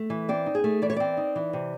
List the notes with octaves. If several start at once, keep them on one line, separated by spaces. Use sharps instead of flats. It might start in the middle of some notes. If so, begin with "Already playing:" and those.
Already playing: A3
E3
C4 D5
D#4
G#4
A3
E3 D5
C#5
C4 D5
D#4
E3
C3